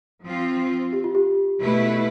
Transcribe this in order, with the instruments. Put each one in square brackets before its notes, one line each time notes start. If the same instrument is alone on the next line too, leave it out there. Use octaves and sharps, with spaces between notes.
[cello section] F3 C4 F4
[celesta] G4
F4
G4
[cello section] B2 A3 E4 B4